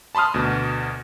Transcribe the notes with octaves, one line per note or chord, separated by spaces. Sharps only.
A5 B5 C6 D#6 F6
D2 B2